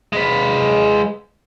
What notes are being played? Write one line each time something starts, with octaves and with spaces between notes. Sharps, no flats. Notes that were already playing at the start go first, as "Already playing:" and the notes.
G#3 B4